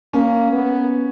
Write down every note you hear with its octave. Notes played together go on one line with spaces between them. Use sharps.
A#3 C#4
B3